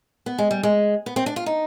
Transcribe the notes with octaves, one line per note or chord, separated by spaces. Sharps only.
B3
G#3
G3
G#3
B3
C4
D4
F4
D#4